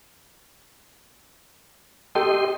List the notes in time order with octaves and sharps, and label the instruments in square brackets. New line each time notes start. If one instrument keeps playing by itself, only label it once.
[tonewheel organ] G4 D#5 C6 [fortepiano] A4 G5